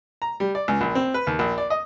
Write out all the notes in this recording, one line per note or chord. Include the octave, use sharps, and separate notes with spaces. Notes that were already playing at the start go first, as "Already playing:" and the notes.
A#5
G3
D5
C#2
A#1
C4
B4
D#2
A#1
D5
D#5